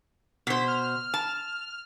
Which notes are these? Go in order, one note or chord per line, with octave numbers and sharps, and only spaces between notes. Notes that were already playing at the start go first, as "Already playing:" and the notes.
B2 C5 B6
F6
A5